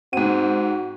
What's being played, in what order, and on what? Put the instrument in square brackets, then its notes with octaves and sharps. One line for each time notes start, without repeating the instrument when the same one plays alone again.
[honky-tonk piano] G#2 D#7 [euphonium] C4 [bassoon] F#4